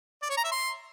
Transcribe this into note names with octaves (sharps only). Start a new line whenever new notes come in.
D5
C#5
A#5
E5
C6